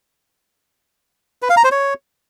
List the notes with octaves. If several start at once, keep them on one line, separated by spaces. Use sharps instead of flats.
B4
F5
A#5
C5
C#5